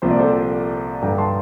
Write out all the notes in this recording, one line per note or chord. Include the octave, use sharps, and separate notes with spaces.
C2 A#2 F3 C4 C5
D5
A4 C5
G2 D3 G3 G5 A#5
A5 C6